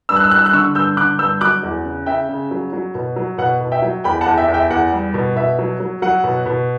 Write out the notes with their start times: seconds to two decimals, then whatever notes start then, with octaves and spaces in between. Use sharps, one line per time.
0.09 G2 E6
0.16 F#6
0.24 E6
0.31 G3 F#6
0.39 E6
0.46 F#6
0.53 D3 C#6 E6
0.75 G2 E6 G6
0.97 D3 D6 F#6
1.19 G2 E6 G6
1.41 F#3 D6 F#6
1.63 E2
1.85 C#3
2.06 C#3 E5 G5
2.29 C#3
2.51 F#3
2.73 F#3
2.95 B2
3.16 F#3
3.38 B2 F#5
3.61 B2
3.72 E5 G5
3.82 F#3
4.04 E2 G5 B5
4.21 F#5 A5
4.26 E2
4.38 E5 G5
4.48 E2
4.54 E5 G5
4.70 E2 F#5
4.92 G3
5.14 B2
5.36 B2 E5
5.59 F#3
5.80 F#3
6.02 F#3 F#5
6.24 B2
6.46 B2